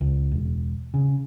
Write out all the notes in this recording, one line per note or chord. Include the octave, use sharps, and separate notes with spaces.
C#2
E1
C#3